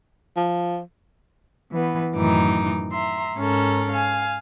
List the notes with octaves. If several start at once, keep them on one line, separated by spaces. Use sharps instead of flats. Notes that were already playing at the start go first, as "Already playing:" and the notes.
F3
E3 B3
F#2 A2 D#3 E3 D#4 D6
E5 A#5 C6
G#2 C#4 A4 A#4
F5 G#5